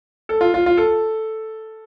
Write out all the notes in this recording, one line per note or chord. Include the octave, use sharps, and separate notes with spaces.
A4
F4
F4
F4
A4